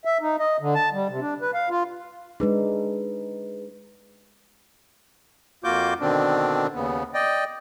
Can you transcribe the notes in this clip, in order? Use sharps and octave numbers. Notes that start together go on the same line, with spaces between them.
E5
D#4
D#5
D3
A5
G3
C3
D4
B4
F5
F4
G#3 D4 D#4 G#4 B4
F2 A#3 F4 F#4 D6 G6
B2 D3 D#3 C4 D4
D#2 C#3 B3
D5 D#5 G5